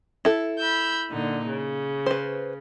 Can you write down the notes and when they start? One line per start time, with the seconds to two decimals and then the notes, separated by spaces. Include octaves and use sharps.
0.25 E4 A4
0.59 B5 E6 G6
1.10 A#2 D3 D#4
1.48 C#3
2.06 B4 C5